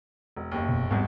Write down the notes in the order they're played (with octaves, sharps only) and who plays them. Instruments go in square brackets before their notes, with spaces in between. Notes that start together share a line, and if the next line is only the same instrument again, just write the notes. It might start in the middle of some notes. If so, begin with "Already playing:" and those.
[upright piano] E1
F#1 D#2
[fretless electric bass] E1 B2
[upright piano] G#1 E2 [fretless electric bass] G#2 G3